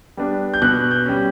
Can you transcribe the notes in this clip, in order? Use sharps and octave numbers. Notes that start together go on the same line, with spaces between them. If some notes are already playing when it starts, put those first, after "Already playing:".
G3 B3 D4
G6
B2 F#6
G6
G3 C#4